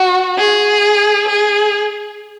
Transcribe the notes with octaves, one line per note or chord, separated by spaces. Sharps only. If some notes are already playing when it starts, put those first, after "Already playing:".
Already playing: F#4
G#4
G#4